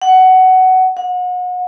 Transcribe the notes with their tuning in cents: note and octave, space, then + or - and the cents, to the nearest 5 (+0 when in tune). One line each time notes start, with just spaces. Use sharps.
F#5 +15
F#5 -35